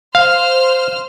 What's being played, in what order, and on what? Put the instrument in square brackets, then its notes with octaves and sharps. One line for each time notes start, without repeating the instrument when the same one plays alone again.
[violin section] C5 F6 [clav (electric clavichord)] F5